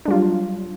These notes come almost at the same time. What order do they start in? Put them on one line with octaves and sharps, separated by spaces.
D4 G3 F4 F#3